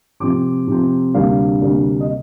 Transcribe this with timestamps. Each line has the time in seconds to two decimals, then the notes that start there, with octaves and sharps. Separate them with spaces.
0.20 C3 F3 C4 D6
0.67 C3 F3 C4
1.14 D2 C3 G3 A#3 D4 F5
1.61 D2 C3 G3 A#3 D4
2.00 D#5